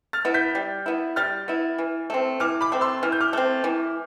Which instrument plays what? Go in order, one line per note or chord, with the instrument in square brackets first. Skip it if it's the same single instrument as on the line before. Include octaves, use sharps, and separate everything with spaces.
[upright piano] F6 A6
[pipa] B3 E4
[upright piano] G6 B6
[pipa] G3
B3 E4
[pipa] G3 [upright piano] F6 A6
[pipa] B3 E4
E3
A3 C4
[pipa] E3 [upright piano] D6 F6
[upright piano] B5 D6
[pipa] A3 C4
[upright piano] C6 E6
[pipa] E3 [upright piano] F6
[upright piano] G6
D6 F6
[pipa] A3 C4
E3